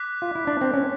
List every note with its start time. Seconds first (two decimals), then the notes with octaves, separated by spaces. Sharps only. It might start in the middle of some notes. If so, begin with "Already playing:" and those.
Already playing: D6 F#6 B6
0.22 F4
0.35 E4
0.47 D4
0.61 C4
0.74 C#4